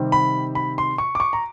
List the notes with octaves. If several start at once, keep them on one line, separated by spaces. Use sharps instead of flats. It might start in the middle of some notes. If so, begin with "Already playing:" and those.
Already playing: C3 D#3 G3 C4
B5
B5
C6
C#6
D6
C#6
A#5